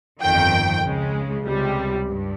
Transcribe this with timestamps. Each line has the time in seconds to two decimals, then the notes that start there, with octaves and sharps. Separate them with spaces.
0.21 G1 F2 D#3 G5
0.83 C#2 C#3 G#3
1.45 C#2 C3 G3
2.07 G2